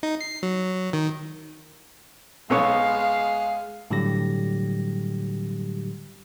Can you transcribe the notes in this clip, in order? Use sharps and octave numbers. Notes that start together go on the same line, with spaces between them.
D#4
C7
F#3
D#3
B1 G#3 B3 C#5 F5
A2 D3 F#3 G3 G4 A#6